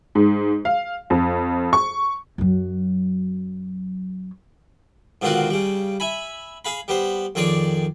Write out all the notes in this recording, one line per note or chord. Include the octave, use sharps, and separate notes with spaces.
G#2
F5
F2
C#6
F#2 F#3
G#2 B2 D3 D#3 F4 F#4
C#3 G3
E5 G#5 B5
G#4 F5 B5
G3 B3 C5
F2 D#3 G#4 C#5 D5